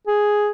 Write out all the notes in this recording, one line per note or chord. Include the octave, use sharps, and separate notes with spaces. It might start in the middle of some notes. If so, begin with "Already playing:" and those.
G#4